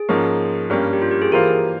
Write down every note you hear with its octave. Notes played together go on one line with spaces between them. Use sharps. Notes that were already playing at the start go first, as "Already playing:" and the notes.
Already playing: G#4
G#2 F3 A#3 C#4
G2 G3 A#3 C#4
G4
F4
G4
G#4
E3 A#3 F4 G4 A#4 C5 F5